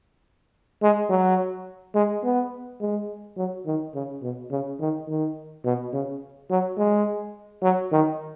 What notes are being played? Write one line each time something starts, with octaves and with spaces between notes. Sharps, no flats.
G#3
F#3
G#3
B3
G#3
F#3
D#3
C#3
B2
C#3
D#3
D#3
B2
C#3
F#3
G#3
F#3
D#3